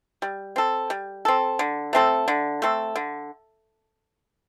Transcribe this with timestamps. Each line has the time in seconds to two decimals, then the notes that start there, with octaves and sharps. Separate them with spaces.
0.22 G3
0.56 C4 A4
0.90 G3
1.25 C4 A4
1.59 D3
1.93 A3 C4 A4
2.28 D3
2.62 A3 C4 A4
2.96 D3